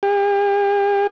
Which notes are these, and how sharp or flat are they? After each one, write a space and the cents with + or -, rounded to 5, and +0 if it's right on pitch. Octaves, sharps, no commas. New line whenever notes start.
G4 +45